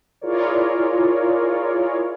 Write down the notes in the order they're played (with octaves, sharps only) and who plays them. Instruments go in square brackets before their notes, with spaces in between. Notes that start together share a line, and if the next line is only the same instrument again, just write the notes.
[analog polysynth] E4 F4 G#4 A#4 C#5 D5